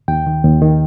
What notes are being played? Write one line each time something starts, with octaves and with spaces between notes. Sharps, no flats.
D#2 G5
D#3
D#2
D#3